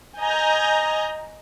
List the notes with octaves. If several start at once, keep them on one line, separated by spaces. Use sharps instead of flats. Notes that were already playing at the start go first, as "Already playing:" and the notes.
D#5 G#5 A#5 G6